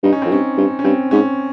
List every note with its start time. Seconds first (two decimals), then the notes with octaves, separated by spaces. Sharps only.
0.03 G2 D#4
0.12 C#4
0.22 F2 C4
0.30 G2 C#4
0.57 G2
0.79 C#4
0.84 G2 C4
1.11 G#2 C#4